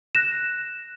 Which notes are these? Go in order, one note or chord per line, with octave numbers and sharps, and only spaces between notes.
F#6 A#6 E7